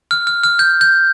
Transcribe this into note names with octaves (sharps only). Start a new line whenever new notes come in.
F6
F6
F6
G6
G6